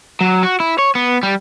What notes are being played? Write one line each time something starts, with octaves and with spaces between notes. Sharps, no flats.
F#3
F#4
E4
C#5
B3
G3